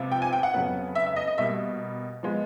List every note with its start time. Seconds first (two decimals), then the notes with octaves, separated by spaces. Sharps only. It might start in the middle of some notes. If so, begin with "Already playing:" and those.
Already playing: C3 F3 G#3 B3
0.12 G5
0.22 G#5
0.33 G5
0.43 F#5
0.54 F2 C#3 F#3 B3
0.95 E5
1.06 E5
1.16 D#5
1.27 D#5
1.38 B2 G3 A#3 E5
2.23 F3 G#3 B3